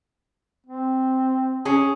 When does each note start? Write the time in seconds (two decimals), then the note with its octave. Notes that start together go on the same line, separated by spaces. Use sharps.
0.67 C4
1.65 C#4 G#4